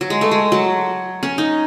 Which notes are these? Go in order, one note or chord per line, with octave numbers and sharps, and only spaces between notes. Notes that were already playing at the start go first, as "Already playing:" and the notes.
F#3
G#3
A3
G#3
F#3
C#4
D#4